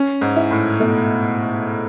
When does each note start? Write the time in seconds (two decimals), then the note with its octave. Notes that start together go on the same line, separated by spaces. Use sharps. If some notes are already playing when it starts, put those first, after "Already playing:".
Already playing: C#4
0.21 G#2
0.36 E4
0.51 A2
0.80 B2 A3